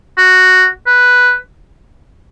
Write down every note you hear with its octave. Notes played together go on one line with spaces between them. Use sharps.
F#4
B4